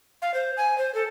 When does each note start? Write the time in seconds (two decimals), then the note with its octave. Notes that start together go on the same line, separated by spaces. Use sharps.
0.22 F5
0.34 C5
0.57 G#5
0.78 C5
0.95 A4